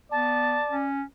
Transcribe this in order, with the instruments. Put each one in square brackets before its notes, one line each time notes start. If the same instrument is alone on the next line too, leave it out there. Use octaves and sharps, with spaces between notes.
[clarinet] B3 [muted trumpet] D5 [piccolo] A5
[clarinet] C#4